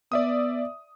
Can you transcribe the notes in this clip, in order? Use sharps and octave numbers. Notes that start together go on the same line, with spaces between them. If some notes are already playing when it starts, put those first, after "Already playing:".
B3 D5 E5 D#6